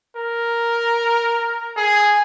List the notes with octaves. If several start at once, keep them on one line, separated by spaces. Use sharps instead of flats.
A#4
G#4